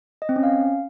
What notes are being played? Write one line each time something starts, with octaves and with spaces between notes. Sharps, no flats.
D#5
C4
C#4
F5